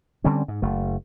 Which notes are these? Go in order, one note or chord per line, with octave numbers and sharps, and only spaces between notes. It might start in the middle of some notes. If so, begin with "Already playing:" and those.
D3 G3 C4 C#4
G#2
F#1 A3